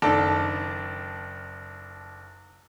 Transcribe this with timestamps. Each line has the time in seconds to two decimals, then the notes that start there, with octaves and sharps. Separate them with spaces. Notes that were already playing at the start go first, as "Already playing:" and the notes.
0.02 F#1 D#3 D4 A4